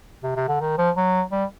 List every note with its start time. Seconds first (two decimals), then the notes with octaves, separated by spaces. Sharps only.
0.24 C3
0.36 C3
0.48 D3
0.61 D#3
0.78 F3
0.97 F#3
1.32 G3